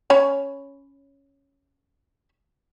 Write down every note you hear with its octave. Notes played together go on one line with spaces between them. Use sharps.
C#4 C#5 B5